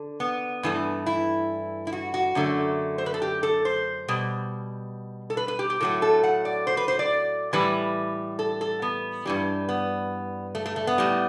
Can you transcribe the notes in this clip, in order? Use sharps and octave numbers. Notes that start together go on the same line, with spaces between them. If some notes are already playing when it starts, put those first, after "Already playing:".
Already playing: D3
B3
G2 E3 A3
E4
E4
F#4
F#4
F#2 D3 A3
C5
B4
A4
G4
A4
C5
B2 G3
A4
B4
B4
G4
G4
A2 F#3 A3 A4
A4
F#5
D5
C5
B4
C5
D5
A2 E3 G3 B4
A4
A4
B3
G2 E3 G3
B3
A3
A3
A3
B3
A2 G3